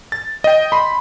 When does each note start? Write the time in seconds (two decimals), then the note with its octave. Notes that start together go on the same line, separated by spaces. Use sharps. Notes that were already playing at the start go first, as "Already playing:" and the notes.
0.12 A6
0.44 D#5 G5
0.72 B5 C6